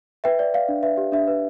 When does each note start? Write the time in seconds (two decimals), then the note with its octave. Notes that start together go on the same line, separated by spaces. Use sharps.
0.24 B4 E5 G5
0.39 D5
0.54 D5 F5
0.69 D4
0.83 B4 E5
0.97 G4
1.12 D4 E5
1.28 B4